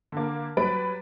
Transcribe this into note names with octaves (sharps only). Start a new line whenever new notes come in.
D3 A#3
F#3 G3 B4 B5 A6 D7